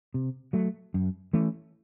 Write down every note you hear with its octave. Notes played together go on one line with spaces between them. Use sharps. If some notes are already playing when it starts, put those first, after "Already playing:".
C3
F#3 A3
F#2
E3 A3 C#4